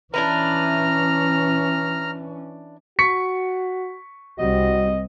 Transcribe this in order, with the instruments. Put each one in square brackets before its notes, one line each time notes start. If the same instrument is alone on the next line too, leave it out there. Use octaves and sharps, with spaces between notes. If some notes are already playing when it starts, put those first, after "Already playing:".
[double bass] E3 C#4 [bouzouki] D4 E4 B4 [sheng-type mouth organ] A#5 F6
[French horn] F#4 [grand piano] C#6 B6 C#7
[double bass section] C2 G3 C4 [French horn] F#4 [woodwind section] D#5